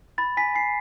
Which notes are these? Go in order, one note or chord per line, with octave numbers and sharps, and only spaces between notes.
B5 A6
G#5 B6
G#5 C7